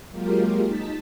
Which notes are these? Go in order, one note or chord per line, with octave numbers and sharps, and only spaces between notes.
F#3 G#3 A#3 F4 G4 A#4
D#4 A5 B6